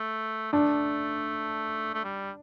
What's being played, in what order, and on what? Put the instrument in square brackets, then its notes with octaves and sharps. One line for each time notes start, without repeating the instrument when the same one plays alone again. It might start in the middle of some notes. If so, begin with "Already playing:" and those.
Already playing: [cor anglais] A3
[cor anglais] A3 [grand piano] D4
[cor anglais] A3
G3